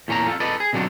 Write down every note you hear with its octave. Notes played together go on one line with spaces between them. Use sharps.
E2 A#2 C#4 D4 A#5
F4 A4
A4 B4 D5 D#5
G#4
B2 D3 F#3 G3 D4 F4